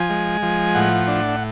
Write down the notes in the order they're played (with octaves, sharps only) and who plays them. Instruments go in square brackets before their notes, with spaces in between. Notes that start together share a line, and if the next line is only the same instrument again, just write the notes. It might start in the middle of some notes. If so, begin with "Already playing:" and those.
Already playing: [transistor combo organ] F3 G#5
G#3
F3
A2 F#5
D4